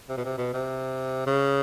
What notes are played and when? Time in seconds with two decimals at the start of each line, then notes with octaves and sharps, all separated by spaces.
0.09 C3
0.17 B2
0.25 C3
0.38 B2
0.53 C3
1.27 C#3